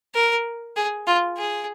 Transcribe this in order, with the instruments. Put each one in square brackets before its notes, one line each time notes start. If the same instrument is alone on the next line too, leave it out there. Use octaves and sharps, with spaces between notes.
[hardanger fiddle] A#4
G#4
F4
G#4